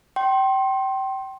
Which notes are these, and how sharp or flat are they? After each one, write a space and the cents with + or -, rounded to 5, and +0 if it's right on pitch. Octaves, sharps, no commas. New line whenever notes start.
G5 -25 C6 +25